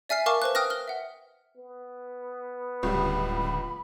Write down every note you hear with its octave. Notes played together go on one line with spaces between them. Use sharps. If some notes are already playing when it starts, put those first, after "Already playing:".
D5 E5 G#5 F6 C7
A#4 F5 A5 C#6 D6 F6
B4 C5 F#6
G5 D#6 F6 F#6 A#6
F6 G7
E5 F#5
B3
D1 C#2 G3 B5